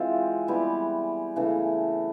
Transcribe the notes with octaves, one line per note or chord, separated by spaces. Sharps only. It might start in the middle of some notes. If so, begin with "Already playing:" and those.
Already playing: E3 G#3 C4 F4
G3 B3 E4
C#3 E3 A3